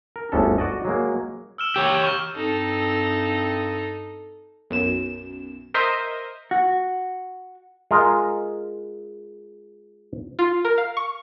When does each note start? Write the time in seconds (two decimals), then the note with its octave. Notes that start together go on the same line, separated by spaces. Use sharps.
0.16 A#4
0.32 G1 D2 G#3 C#4 D4 A4
0.58 F#4 D5 D#5
0.85 F#3 G#3 A#3
1.58 E6 F6 E7
1.76 G4 C#5
2.04 C#6 F6
2.35 G2 C4 D#4 A4
4.71 B1 F#2 E7
5.74 A#4 C5 D#5 E5
6.51 F#4
7.91 G#3 F4 A#4 D#5
10.39 F4
10.65 A#4
10.78 F5
10.97 C#6